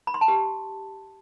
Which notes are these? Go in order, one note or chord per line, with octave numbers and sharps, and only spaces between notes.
B5
C6
A5
G4